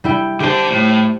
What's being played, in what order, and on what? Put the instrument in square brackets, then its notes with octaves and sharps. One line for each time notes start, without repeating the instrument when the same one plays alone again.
[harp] G3 E4 G5
[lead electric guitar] D3 A5 [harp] G4 C5
[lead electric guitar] A2